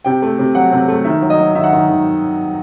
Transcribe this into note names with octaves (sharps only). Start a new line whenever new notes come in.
C3 G5
A3
C3
F#3 F#5
C3
A3
D#3 E5
F#3
D#5
F#3
D#3 E5
F#5
D#3 E5
D#3